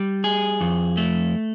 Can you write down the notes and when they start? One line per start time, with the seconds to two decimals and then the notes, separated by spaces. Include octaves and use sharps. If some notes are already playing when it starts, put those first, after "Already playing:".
Already playing: G3
0.24 G#4
0.61 F2
0.97 A3